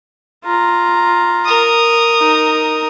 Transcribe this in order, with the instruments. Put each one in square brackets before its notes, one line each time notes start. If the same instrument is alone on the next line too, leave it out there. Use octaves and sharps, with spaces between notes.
[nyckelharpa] F4 A#5
[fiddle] A#4 D#6
[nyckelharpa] D#4